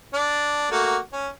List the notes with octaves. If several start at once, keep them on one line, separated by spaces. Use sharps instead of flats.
D4
A3 A#3 F#4
C#4